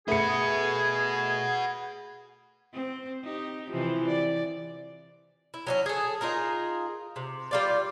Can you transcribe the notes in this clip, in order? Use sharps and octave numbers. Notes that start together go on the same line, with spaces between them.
A3 F#4 G#4 B4 C#7
C4
D#4 G4
C3 E3 F3
D5
E4
F#3 A3 C#4
G#4 A4
D#4 F4 G#4 A#4
C3
G3 F4 D5